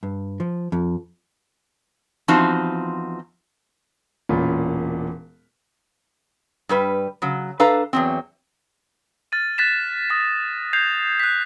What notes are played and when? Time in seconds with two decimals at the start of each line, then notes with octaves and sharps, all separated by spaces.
0.03 G2
0.40 F3
0.72 F2
2.28 E2 F3 C4 D#4 F#4
4.29 E1 A#2 C#4 F4 A#4 B5
6.69 G2 G3 B4
7.22 C#3 F#3
7.60 D4 A4 B4 F5 A#5
7.93 E2 F#3 C4
9.32 F6 A6 D#7
9.58 F#6 A6 B6 E7
10.10 D#6 A#6 B6
10.73 G6 G#6 C7 F7
11.20 F#6 B6